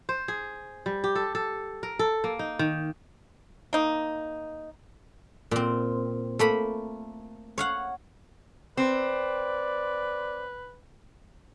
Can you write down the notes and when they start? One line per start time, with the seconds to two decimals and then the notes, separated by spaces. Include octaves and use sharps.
0.09 C5
0.28 G#4
0.86 G3
1.04 G4
1.15 A4
1.35 A4
1.83 A#4
1.99 A4
2.24 A#3
2.39 D#4
2.59 D#3
3.73 A#3 D#4
5.51 A#2 C4
6.39 A3 A#3 B5
7.58 C#5 F5 F#5
8.77 C4 B4 D5